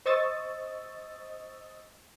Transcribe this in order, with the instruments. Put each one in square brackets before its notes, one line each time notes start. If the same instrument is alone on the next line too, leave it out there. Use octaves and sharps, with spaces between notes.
[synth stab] C5 D#5 C#6 D#6 E6 A6